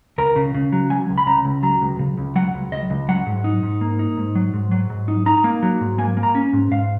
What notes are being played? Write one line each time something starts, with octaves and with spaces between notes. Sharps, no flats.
C#2 A#4
C#3
C#3
F#3
F#3 G#5
C#2
B5
C#3 A#5
C#2
F#3 A#5
C#2
C#3
C#2
F#3 F#5
C#2
C#2 D#5
C#2
F#3 F#5
G#2
D#4
G#2
A#3
D#4
G#2
F#3
G#2
F#3
G#2
D#4
D#4 A#5
A#3
F#3
G#2
A#3 G#5
A#3
A#5
C#4
G#2
G#2 F5